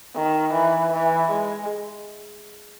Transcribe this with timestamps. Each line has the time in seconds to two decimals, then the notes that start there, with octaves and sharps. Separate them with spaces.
0.15 D#3
0.53 E3
0.93 E3
1.31 G#3